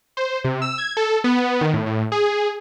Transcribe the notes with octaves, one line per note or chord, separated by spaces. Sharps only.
C5
C3
E6
G#6
A4
B3
D#3
A2
A2
G#4